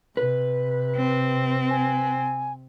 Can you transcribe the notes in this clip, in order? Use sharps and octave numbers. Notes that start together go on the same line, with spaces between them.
C3 B4
C4
G#5